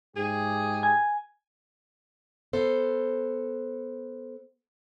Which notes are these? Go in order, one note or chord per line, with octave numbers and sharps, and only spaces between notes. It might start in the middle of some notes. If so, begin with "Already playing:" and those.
G#2 G4 G#4
G#5
B3 A4 C5